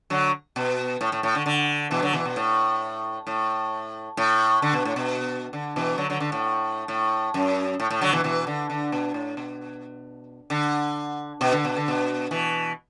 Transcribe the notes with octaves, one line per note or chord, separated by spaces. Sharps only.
D3 F#3
B2
A2
A2
A2
D3
D3
B2 E3
D3 F#3
B2 E3
B2
A2
A2
A2
D3
B2
A2
B2
D3
B2 E3
D3 F#3
D3 F#3
D3
A2
A2
F#2
A2
A2
D3 F#3
B2 E3
B2 E3
D3
D3
B2
A2
B2
D3
B2
D3
B2
D3
B2
B2 E3